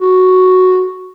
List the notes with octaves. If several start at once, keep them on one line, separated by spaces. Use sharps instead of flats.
F#4